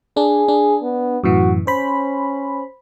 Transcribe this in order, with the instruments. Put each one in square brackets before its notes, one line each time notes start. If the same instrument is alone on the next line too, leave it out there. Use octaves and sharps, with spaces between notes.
[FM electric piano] D4 [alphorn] G#4
[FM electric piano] D4
[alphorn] B3
[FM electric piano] F#2 A2 E3 [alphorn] F#4
[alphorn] C#4 [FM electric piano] C5 B5